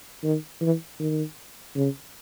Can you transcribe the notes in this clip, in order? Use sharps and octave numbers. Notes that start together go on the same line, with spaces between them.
D#3
E3
D#3
C#3